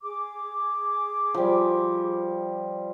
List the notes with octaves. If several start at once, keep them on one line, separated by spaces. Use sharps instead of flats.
G#4 D6
F3 G3